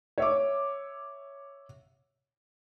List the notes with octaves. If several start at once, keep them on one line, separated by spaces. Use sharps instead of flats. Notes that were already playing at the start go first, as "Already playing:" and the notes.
C#5 E5 D6